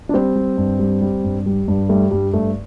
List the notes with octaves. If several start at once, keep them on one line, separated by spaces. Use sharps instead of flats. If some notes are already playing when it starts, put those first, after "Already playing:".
D4
G3 C4
G3
G2
G3
G3
G2
G3
G2
G3 A3
G2 G3
G2 A3